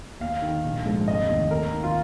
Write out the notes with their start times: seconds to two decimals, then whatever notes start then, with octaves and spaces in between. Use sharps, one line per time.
0.20 D#2 F5
0.42 D#3
0.65 A#1
0.86 G#2 F3
1.07 F1 D#5
1.29 D#2 D#3
1.51 D#2 A#4
1.73 D#3
1.84 F4